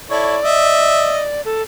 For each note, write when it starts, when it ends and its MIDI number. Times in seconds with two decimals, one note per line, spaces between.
0.10 0.37 64
0.10 0.37 69
0.10 0.37 73
0.10 1.41 74
0.44 1.22 75
0.44 1.22 76
1.45 1.62 69